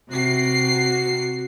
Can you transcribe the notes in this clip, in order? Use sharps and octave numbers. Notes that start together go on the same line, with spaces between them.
C3 F#4 C7